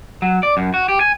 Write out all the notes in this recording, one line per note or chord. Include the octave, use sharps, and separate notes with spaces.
F#3
D5
F#2
F#4
G4
G#5